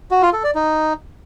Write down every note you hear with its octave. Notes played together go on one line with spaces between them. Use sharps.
F#4
F4
A4
D5
D#4